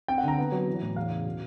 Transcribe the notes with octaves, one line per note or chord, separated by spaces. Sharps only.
C4 G5
F#5
D3 A#5
B3
F#3
E3
A2
E2 F5
C#3
B2